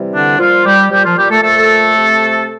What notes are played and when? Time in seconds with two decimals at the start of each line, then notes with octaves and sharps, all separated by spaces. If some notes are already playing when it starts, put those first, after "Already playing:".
Already playing: C3 E3 G3
0.13 D3 D4
0.39 A#2 F3 G3 F4
0.65 G3 G4
0.91 A#2 F3 G3 G4
1.04 F3 F4
1.17 G3 G4
1.30 A3 A4
1.43 A#2 F3 A3 A4
1.96 C3 F3